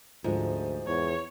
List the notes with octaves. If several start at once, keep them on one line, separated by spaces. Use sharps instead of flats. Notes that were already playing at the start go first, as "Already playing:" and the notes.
D2 G#2 F3
E2 C#5